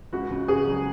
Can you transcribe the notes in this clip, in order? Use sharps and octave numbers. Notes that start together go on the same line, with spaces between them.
C#2 F#4
C#3
C#3 G#4
F#3